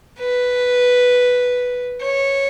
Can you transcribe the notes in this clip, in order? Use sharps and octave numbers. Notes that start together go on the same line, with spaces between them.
B4
C#5